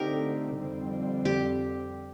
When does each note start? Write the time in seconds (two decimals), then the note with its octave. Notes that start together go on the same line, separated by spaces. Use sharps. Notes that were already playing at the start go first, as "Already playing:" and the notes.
Already playing: D3 A3 C4 D#4 G4 A#4
0.58 F2 D3 G3 C4
1.25 G4